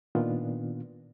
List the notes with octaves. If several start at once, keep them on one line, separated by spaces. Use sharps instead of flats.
A#2 D#3 B3 D4 F4